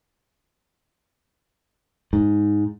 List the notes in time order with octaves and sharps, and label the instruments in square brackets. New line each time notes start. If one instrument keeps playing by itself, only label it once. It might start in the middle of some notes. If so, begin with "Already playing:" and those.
[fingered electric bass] G#2